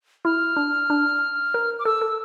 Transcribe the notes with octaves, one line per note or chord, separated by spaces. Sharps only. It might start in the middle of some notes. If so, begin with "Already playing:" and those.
E4 F6
D4
D4
A#4
D6
A4 E6
A4